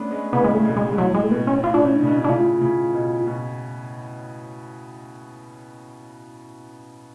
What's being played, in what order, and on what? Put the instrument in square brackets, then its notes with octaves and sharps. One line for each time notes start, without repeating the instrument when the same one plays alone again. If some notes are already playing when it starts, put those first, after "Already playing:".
Already playing: [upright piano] A3 B3 C#4 D4
G#3 B3
[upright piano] A2 C#3 [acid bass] B3
[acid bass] G#3
A3
[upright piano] B2
[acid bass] G#3
[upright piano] B2
[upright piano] A2 [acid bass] F#3
[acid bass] G#3
A3
[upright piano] B2 [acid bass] B3
[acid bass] C#4
[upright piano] A2 [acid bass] F4
[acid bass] D4
[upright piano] A2 [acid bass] C#4
[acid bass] D4
[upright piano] C#3
B2
[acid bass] D4
[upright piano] A2 C#3 [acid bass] F4
[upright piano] A2 C#3
B2
B2